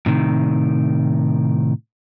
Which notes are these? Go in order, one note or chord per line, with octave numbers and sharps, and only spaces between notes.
A2 C3 D#3